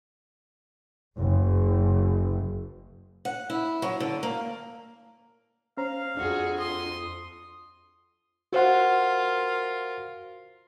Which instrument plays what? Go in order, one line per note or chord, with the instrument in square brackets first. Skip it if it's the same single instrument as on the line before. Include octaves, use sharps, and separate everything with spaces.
[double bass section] F#1
[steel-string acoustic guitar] F#5
E4
F#3
D3
A#3
[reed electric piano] C#4 C5 A#5 [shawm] F5
[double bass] F2 [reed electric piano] D4 [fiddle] F#4 G#4
[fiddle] C6 [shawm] D#6
[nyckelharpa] F4 A#4 [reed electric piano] F#4 C5 F#5